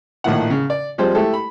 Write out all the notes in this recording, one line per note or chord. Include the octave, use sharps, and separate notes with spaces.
A#1 A2 D#3 F3 E4 F#5
C#3
D5
F3 G3 G#3 C4 C5
A3 E4 G4 A4
B5